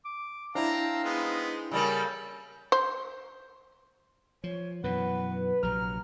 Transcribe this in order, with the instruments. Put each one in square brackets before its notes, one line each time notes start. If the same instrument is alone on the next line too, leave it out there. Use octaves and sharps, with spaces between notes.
[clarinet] D6
[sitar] C4 [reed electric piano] D4 E4 [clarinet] F5 [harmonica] A5 A#5
[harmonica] G#3 B3 D#4
[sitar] C#3 G3 A#3 [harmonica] A4
[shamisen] C5
[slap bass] F3 [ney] C#5
[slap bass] F#2 B2 E3 [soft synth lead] B4 [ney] F#5
[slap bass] A#1 C3 F#3 [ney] A#5 [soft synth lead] F6